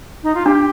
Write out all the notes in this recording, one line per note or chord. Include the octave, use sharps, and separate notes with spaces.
D#4
F4
D4 G4